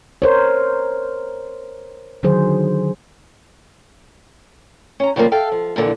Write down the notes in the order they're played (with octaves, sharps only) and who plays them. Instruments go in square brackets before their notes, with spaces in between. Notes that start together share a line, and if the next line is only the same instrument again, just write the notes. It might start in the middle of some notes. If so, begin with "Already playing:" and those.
[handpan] A#4 C5 C#5
D3 D#3 F#3 G#4 C5
[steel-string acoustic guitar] C#4 A#5
C#3 F3 G3 A#3
A4 E5 F5 G5
F3
F2 A#2 D3 E3